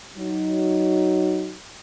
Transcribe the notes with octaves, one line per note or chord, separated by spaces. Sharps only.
F#3 D#4